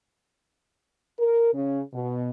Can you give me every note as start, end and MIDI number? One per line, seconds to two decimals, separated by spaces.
1.19 1.53 70
1.54 1.81 49
1.93 2.30 47